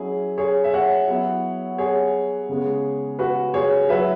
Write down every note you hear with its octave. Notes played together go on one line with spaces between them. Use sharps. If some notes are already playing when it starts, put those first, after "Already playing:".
Already playing: F#3 C#4 E4 G#4
G#4 C#5
E5
C#5 F#5
F#3 B3 E4
G#4 C#5
C#3 G#3 B3
F#4 B4
G#4 C#5
F#3 E4 B4 E5